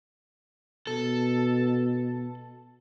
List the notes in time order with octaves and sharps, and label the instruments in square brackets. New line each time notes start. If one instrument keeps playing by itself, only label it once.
[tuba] B2 [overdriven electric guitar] A4